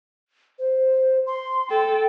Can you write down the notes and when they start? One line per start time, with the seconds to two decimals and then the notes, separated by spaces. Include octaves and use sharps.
0.59 C5
1.27 C6
1.70 A4 G5